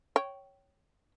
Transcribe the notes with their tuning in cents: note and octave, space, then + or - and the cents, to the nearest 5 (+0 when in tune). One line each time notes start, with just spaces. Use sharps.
C#5 +0 G5 -15